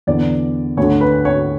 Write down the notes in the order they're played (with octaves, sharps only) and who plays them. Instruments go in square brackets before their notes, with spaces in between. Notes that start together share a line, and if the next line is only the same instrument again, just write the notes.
[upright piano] E2 D3 D5
D2 C#5
D3
B4
C#5